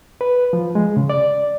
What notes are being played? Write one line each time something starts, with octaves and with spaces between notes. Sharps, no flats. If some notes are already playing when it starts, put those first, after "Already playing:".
B4
F3
G#3
C#3
D5